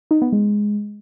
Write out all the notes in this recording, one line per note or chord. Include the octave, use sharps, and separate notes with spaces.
D#4
B3
G#3